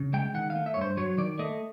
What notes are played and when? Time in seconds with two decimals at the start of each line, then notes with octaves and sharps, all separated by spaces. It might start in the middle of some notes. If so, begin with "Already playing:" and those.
Already playing: C#3
0.14 G#3 G5
0.34 D#3 F#5
0.50 F5
0.55 A3
0.66 E5
0.74 C#5
0.77 G2 C5
0.97 F#3 C#5
1.18 D#3 D5
1.39 A3 D#5